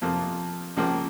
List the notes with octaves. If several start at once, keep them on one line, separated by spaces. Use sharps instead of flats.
F2 C3 F3 A#3
C#2 C#3 F3 A#3